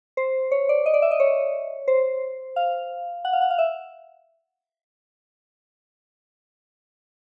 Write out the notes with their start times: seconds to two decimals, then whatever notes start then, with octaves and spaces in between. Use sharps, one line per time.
0.17 C5
0.51 C#5
0.69 D5
0.86 D#5
0.94 D5
1.02 E5
1.11 D#5
1.20 C#5
1.88 C5
2.56 F5
3.25 F#5
3.33 F5
3.41 F#5
3.50 F5
3.58 E5